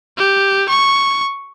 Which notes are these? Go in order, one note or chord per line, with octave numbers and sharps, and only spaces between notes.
G4
C#6